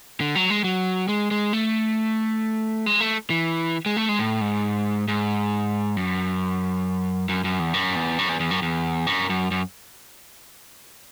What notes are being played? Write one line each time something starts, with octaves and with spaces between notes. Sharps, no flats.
D3
F#3
G#3
F#3
G#3
G#3
A3
G#3
A3
E3
G#3
A3
G#3
A2
G#2
G#2
F#2
F#2
F#2
E2
F#2
E2
F#2
E2
E2
F#2
E2
F#2
F#2
F#2